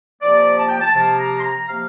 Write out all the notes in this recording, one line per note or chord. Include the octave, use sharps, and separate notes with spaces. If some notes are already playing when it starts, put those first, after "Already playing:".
C3 F3 A#3 D5
A5
G5
A5
C3 F3 A#3 A5
A#5
C6
A#5
C3 F3 A#3 F5